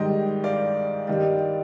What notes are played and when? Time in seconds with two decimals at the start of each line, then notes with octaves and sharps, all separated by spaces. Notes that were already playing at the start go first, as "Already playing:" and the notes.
Already playing: G#2 D#3 G3 D#5 G5
0.44 D5 F5
1.08 G2 D#3 G3